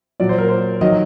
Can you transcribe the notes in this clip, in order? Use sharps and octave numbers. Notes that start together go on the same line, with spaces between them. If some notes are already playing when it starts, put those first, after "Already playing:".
A#2 F#3 D5
C5
A#4
C5
D#3 F#3 D#5